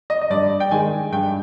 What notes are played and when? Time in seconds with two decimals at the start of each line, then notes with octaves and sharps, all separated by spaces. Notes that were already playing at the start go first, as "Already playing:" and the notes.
0.10 D#5
0.22 D#5
0.30 G2 D5
0.60 G5
0.71 D#3 G#3 G#5
1.12 G2 G5